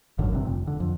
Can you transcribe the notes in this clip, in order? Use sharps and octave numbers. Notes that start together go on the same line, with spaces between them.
G#1 F#2 D3 D#3
G2 C3
F1
D3
F2